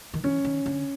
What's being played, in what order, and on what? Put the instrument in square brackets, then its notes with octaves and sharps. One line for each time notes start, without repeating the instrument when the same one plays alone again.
[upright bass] D#3
[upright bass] E3 [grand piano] C#4
[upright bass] D#3
D3